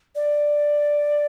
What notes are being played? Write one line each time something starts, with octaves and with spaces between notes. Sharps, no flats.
D5